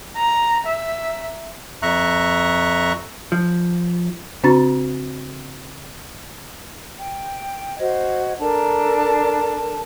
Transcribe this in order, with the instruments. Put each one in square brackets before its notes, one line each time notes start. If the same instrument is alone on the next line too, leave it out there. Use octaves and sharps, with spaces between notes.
[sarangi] A#5
E5
[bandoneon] F2 E5 A#5 C#6 F#6
[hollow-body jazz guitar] F3
[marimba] C#3 C4 D4 F#4 A#5 A6
[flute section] G5
F#4 C5 D#5 G#6
D4 A4 A#4 A5